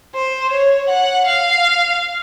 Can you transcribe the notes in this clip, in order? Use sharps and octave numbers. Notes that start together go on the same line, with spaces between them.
C5
C#5
F#5
F5